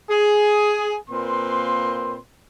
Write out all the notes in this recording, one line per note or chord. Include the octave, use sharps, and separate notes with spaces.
G#4
A#2 A#3 C4 B4 C6